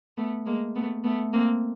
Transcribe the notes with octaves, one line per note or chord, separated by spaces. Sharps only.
A3 B3
G#3 A#3
A3 B3
A3 B3
A#3 C4